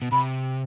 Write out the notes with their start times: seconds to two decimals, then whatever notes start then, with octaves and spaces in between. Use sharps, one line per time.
0.02 B2
0.12 C3 B5